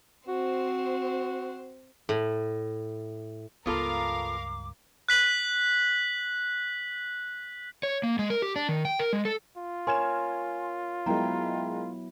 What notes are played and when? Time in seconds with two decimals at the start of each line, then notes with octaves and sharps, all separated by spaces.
0.28 C4 F#4 C5
2.09 A2
3.66 C#2 G2 B3 F4 A4 A#4 F5 D6
5.09 F#6 B6 F#7
7.83 C#5
8.03 A#3
8.19 G#3
8.30 A#4
8.42 G4
8.56 D4
8.69 D#3
8.85 G5
8.99 A#4
9.13 G#3
9.25 A4
9.57 F4
9.87 A#4 C#5 G#5 C6 F6 G#6 E7
11.06 F#3 G#3 B3 E4 A#4 G5 A#5